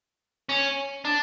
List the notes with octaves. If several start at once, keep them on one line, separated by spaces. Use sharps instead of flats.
C#4
D4